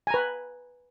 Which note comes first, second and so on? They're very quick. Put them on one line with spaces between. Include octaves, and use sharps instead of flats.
G#5 A#5 B4